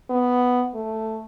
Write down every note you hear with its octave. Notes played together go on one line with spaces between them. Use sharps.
B3
A3